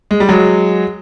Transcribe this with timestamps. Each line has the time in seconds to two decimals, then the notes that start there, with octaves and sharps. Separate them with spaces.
0.11 G#3
0.20 G3
0.29 F#3 G#3